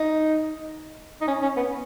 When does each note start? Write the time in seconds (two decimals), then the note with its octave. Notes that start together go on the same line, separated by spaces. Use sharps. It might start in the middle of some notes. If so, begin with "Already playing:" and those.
Already playing: D#4
1.21 D#4
1.28 C#4
1.42 C#4
1.57 B3